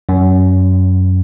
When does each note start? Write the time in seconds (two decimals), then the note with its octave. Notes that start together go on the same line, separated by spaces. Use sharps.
0.09 F#2